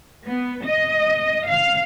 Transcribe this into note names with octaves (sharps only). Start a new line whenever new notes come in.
B3
D#5
F5